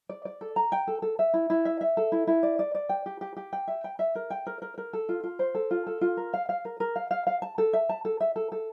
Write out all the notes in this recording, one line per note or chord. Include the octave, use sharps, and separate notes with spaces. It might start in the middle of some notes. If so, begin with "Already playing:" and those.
D5
D5
A4
A#5
G5
A4
A4
E5
E4
E4
E5
E5
A4
E4
E4
D5
D5
D5
G5
G4
G4
G4
G5
E5
G5
E5
A#4
G5
A#4
A#4
A#4
A4
F4
F4
C5
A4
F4
A4
F4
A#4
F5
F5
A#4
A#4
F5
F5
F5
A5
A4
E5
A5
A4
E5
A4
A4